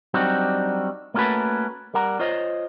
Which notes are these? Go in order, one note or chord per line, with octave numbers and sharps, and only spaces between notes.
F#3 G3 C4 D4 D#4 F#4
A3 A#3 C#4 F#4 A4 B4
G3 A#4 F#5 A#5
F4 C5 C#5 D#5